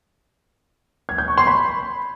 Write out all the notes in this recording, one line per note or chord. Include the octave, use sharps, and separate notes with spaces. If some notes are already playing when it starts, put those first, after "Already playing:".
G#6
G6
C#6
C6
B5